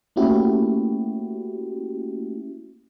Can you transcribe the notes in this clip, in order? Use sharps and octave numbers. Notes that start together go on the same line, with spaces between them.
A3 A#3 C#4 E4 F#4 G4